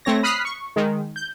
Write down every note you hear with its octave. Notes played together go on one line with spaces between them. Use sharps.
A3 C4 C#5 A#6
B5 D#6 F6 F#6 B6 C7
C#6
D#3 G#3
G6